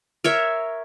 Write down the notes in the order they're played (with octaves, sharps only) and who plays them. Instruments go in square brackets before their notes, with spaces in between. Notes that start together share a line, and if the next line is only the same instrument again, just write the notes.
[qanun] A#4 C#5 E5